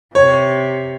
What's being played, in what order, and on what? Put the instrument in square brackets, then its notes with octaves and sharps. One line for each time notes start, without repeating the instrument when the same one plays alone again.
[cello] C3 [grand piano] C#5